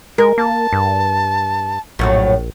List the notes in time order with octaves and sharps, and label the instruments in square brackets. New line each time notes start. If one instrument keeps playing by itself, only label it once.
[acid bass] G#3 [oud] A#4
[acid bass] A#3 [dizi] A5
[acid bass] G2
[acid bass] A#1 [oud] F#2 A2 F#3